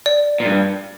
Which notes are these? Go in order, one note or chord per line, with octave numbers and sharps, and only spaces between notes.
D5
A#2
G2